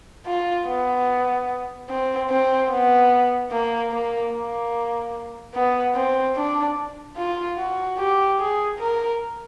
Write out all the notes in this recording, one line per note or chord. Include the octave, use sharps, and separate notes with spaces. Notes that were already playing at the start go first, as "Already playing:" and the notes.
F4
B3
C4
C4
B3
A#3
A#3
A#3
B3
C4
D4
F4
F#4
G4
G#4
A#4